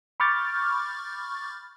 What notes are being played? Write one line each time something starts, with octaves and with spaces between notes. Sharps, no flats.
B5 C#6 D6 F6 G6 A6